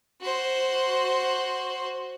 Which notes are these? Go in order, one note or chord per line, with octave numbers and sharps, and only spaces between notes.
F#4 C5